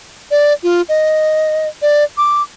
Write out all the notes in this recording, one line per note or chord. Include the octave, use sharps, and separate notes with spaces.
D5
F4
D#5
D5
D6